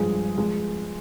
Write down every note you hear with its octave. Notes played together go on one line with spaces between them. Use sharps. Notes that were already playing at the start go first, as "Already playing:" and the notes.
Already playing: G2 F3 G#3 G#4
F3 G#3